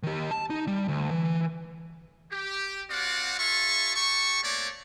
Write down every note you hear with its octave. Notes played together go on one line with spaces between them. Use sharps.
D#3 G4
A5
D#4
G3
D2
E3
G4
C4 F#4 D5 F5 F#5
F4 G#4 E5 A5 C#6
G4 A5 C#6
A3 A#3 C4 C#5 D5